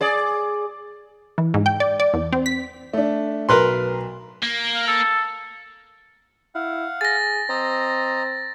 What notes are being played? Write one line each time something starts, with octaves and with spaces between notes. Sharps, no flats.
G#4 D5
E3
G#2
G5
D5
D5
E2
C4
B6
A3 D4
B1 A#4 B4 C6
A#3
F5
A4
E4 F5 F#5
G#4 A6 A#6
C4 D#5 A#5